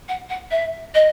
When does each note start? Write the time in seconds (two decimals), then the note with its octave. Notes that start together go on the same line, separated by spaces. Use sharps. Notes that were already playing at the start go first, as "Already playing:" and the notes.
0.08 F#5
0.29 F#5
0.51 E5
0.94 D#5